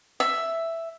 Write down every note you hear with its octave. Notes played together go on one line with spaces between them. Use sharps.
E5